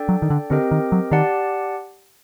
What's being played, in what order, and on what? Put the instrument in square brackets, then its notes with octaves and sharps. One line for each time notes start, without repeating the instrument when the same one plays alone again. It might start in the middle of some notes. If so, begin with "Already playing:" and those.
Already playing: [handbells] D4 A4 D5 G5
[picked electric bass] F#3
D#3
D3
[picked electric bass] D3 [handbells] C4 G4 A#4 D#5 G5
[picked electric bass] D#3
F#3
[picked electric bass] D#3 [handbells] G4 D5 F#5 A5